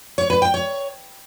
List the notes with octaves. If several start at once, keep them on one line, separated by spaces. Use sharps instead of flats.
C#5
B4
G5
C#5